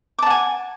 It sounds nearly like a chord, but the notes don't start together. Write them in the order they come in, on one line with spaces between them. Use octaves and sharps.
D6 A5 F#5 G#5